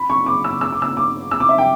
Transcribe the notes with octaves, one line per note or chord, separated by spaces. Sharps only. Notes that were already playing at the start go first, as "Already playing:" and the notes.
Already playing: B5
C#6
D6
E6
E6
D6
E6
D6
E6
D6
E5
G5